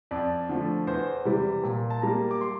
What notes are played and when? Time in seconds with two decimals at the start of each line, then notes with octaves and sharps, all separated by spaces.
0.11 F2 D5
0.49 D3 F3 A3
0.87 E2 C5
1.25 C3 E3 G3
1.64 A#2
1.90 A5
2.02 G3 A#3 A#5
2.31 D6
2.41 C6